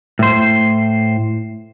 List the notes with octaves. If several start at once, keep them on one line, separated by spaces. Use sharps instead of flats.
A2 C5